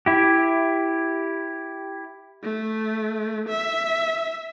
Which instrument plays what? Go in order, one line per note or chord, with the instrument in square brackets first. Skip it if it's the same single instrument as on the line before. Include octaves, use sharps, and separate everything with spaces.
[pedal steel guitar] E4 G4
[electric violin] A3
E5